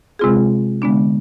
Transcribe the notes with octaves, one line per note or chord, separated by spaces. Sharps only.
C3 G#3 C4 F4 G#4
D3 G#3 B3 D4